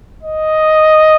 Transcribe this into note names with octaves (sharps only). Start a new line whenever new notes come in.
D#5